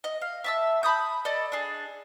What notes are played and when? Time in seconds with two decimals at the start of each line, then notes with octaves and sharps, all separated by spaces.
0.04 D#5
0.22 F5
0.44 E5 A5 E6
0.83 A5 B5 D#6 G6
1.25 A4 D5 D#5
1.52 D4 G#4